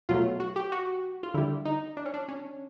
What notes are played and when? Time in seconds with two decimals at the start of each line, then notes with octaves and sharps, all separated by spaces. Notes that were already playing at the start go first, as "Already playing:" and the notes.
0.09 B2 F#3 A3 F4
0.40 F#4
0.56 G4
0.72 F#4
1.23 F4
1.34 D3 G3 E4
1.65 D#4
1.97 D4
2.06 C#4
2.14 D4
2.28 C#4